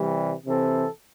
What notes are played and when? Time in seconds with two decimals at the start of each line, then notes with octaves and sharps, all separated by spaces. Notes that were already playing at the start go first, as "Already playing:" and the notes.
Already playing: C3 E3 G3
0.44 C3 E3 C4 A4